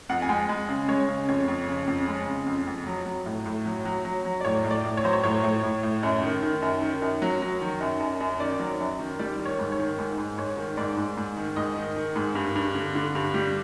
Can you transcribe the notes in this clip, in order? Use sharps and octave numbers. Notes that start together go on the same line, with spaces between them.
F2 F#5
G#5
G#3 G5
G#3
C#3
G#3 C#5
C#3
F2 C#5
F2
C#3
F2
G#3
C#3
F2
F2
F#3
F#3
A2
A2
F#3
F#3
F#3
F#3
D5
A2 C#5
A2
D5
A2
C#5
F#3 C5
C#5
A2 C#5
A2
A2
A2
F#2
D#3
D#3
F#2
D#3
F#2
F#3
F#3
D#3
F#2
F#2
F#2
D#3 D5
F#3
F#2
D#3
G3 D5
D#3
C#5
G#2
C#5
D#3
G#2
G#2
G#2 C#5
D#3
G#2 D5
G#2
G#2
D#3
G#2 D#5
D#3
D#3
G#2
G2
G2
D3
D3
G2
G3